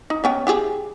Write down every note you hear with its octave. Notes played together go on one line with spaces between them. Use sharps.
D#4
B3 C#4 G5
E4 G4 G#4